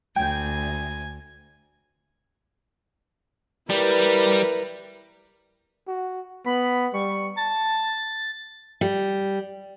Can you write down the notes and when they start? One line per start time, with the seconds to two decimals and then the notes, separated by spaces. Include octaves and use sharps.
0.16 D2 G5 G#5
3.70 G3 E4 A#4 B4
5.88 F#4
6.46 B3 B5
6.94 G3 C#6
7.37 A5 A6
8.81 G3